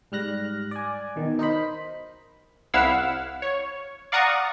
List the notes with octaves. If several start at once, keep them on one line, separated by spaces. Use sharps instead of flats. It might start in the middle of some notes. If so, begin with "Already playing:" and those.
G#2 G3 F6 F#6 A#6
D5 G#5
B2 D#3
D#4 A#4 C5 B5
C2 E4 F5 F#5 E6
C#5
D5 F5 F#5 A#5 C#6 D#6